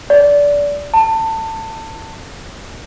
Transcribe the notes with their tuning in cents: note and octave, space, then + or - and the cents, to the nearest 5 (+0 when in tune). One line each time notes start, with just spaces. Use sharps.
D5 -20
A5 +25